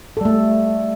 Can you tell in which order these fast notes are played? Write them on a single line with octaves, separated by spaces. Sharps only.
A4 G3 A3